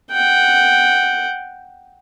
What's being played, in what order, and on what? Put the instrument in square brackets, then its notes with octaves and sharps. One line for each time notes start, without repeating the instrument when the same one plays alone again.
[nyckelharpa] F#5 G5